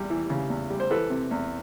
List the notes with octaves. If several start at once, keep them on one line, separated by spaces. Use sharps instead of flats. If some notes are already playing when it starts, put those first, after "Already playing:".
Already playing: E2 G3
E3
C#3
E2
G3
C5
E3 A4 B4
C3
E2